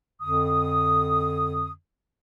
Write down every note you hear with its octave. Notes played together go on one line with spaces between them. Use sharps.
F2 D3 D#6